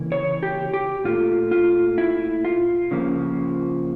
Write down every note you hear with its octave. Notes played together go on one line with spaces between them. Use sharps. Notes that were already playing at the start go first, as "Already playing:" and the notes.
Already playing: C#3 E3 A#3
C#5
G4
G4
A#2 A3 F4
F4
E4
F4
C#3 F3 A#3